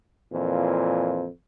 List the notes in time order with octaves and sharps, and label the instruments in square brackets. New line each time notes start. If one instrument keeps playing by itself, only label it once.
[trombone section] F2 A#2 E3